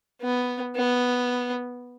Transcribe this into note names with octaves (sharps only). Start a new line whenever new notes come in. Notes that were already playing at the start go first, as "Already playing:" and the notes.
B3
B3